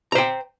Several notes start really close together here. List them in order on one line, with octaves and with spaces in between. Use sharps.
A#5 C5 G5